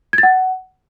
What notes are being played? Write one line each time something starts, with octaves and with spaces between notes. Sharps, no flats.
G#6
A6
F#5